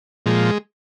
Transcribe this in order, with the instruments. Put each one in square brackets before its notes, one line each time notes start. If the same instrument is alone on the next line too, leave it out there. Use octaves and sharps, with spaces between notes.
[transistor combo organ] A#2 F3 G#3